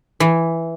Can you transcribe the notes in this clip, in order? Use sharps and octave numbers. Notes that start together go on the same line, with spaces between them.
E3